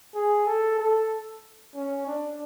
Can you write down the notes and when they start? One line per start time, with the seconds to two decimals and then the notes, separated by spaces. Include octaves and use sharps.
0.15 G#4
0.47 A4
0.79 A4
1.75 C#4
2.07 D4